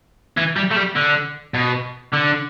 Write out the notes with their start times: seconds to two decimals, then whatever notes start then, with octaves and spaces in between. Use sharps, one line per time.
0.37 E3
0.57 G3
0.71 A3
0.76 G3
0.96 D3
1.54 B2
2.13 D3